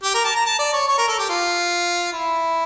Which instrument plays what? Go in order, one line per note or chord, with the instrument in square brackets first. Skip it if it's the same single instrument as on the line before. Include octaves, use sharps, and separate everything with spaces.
[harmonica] G4
A#4
A5
A#5
A5
D5
C#5
C#5
A#4
A4
G4
F4
E4